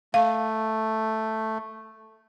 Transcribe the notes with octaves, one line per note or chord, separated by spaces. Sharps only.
A3 F5